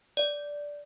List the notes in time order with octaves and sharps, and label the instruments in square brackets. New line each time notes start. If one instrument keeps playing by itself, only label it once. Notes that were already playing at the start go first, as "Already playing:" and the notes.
[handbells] D5